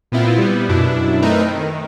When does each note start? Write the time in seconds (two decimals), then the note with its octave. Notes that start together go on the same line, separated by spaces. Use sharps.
0.12 A#2 B3 C4 E4 F4
0.38 G3 B3
0.69 F#2 B2 D4 E4
1.22 A3 C4 D#4 A#4 B4
1.48 D#3